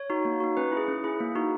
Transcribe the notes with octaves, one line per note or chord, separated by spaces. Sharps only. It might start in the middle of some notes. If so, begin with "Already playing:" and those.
Already playing: C#5
D#4 F#4
A#3
D#4 F#4
C#4 B4
E4
G#4
C#4
E4 G#4
A#3
D#4 F#4